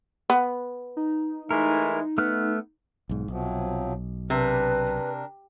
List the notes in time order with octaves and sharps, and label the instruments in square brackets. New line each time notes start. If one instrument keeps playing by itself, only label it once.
[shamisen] B3
[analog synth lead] D#4
[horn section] E3 G#3 A3 [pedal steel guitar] A#4
[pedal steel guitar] A3 F6 F#6 [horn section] B3
[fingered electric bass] B1 G#2
[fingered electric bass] B1 [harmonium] C3 F3 F#3
[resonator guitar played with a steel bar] C3 [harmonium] D4 A#4 [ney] B4